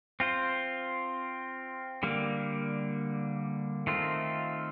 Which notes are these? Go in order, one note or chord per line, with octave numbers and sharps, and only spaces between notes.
C4 F4 C5
D3 G3 A#3
D#3 A3 C4 F4